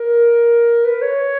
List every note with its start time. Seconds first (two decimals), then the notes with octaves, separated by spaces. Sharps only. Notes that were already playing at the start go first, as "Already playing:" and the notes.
Already playing: A#4
0.85 B4
1.02 C#5